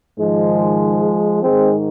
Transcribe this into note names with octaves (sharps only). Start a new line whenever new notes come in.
G#2 D#3 F3 G#3
G#2 D#3 G#3 C4